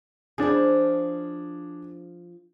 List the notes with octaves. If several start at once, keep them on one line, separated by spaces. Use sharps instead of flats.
F3 D4 E4 G#4